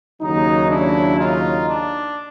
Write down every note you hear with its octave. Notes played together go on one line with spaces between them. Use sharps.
D#2 C#3 F#3 D#4
D4 E4
D#4 F4
D4